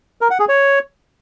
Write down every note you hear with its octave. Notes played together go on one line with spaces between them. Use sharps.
A#4
F#5
G#4
C#5